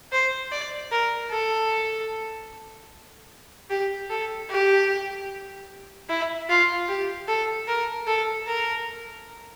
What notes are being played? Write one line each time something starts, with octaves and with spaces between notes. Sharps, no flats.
C5
D5
A#4
A4
G4
A4
G4
E4
F4
G4
A4
A#4
A4
A#4